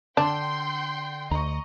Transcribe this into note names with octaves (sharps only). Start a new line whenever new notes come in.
D3 D4 G5 C6 G6
D2 D#5 A#5 C#6